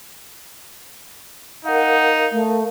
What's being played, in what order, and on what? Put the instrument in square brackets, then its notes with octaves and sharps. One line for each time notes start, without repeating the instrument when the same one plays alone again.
[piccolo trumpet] D#4 [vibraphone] A#4 F5 [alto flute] F#5
[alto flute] A3